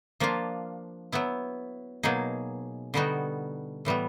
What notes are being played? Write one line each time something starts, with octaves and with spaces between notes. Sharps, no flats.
F3 A#3 D4 F4
F#3 B3 E4
B2 F#3 A#3 D#4 G#4
D3 G3 B3 D#4 F#4
A2 E3 G3 B3